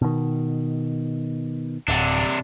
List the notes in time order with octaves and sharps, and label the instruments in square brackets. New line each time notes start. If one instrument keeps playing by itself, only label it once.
[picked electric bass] B2 D#3
[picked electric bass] D1 [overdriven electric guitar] C3 D4